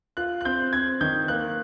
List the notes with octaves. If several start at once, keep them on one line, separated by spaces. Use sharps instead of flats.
F4 F#6
F#6
C4 G6
C4 G#6
D#3 G6
A#3 F#6